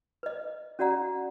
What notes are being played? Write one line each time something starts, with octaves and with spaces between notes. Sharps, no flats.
B4 D#5
C#4 F#4 D5 F#5 A#5